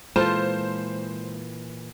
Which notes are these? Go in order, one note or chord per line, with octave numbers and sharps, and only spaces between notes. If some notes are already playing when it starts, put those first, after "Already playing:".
A#2 E3 G#3 F4 A4 C5